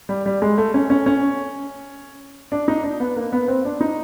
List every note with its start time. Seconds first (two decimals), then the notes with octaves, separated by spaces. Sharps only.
0.09 G3
0.26 G3
0.42 G#3
0.58 A3
0.74 C#4
0.90 C#4
1.06 C#4
2.52 D4
2.68 D#4
2.84 D4
3.00 B3
3.16 A#3
3.33 B3
3.48 C4
3.65 D4
3.81 D#4